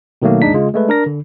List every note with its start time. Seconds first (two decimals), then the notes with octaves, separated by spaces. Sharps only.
0.22 B2 D#3 F#3 A3 A#3
0.42 G#1 D#2 G#3 D4 D#4 B6
0.53 C#3 G#3 F4
0.74 G#3 A3 B4
0.89 D4 A#4 A#6
1.06 D3